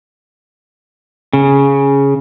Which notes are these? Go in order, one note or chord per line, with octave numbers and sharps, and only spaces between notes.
C#3